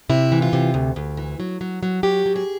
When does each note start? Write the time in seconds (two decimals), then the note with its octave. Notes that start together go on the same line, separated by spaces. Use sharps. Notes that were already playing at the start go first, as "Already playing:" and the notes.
0.09 C3 E4
0.32 E3
0.42 F4
0.53 C3
0.74 D2
0.96 D2
1.17 E3
1.40 F#3
1.61 F#3
1.83 F#3
2.03 F#3 G4
2.26 F#3
2.36 G#4